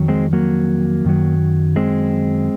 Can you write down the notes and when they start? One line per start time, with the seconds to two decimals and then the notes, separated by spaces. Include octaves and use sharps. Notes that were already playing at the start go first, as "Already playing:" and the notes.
Already playing: F2 D#3 F#3
0.08 G#3 C4
0.33 F#3 A#3
1.05 F#2 D#3 F#3
1.76 G#3 C4